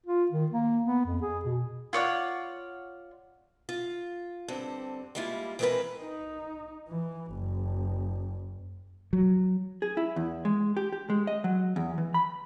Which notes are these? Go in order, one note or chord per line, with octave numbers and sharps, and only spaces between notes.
F4
D#3
A#3
B3
F2
G#4
B2
F4 C#5 D5 F#5
F4
G2 D3 C4
G3 G#3 A#3 E4 F4
E3 G#3 C4 E4 A#4 B4
D#4
E3
F#1
F#3
G#4
E4
E2
G#3
G4
G4
G#3
D#5
F#3
E2
E3
B5